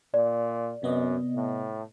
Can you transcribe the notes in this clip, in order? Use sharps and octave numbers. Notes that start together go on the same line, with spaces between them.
A#2 D5
F#2 C3 B3 D#5
A2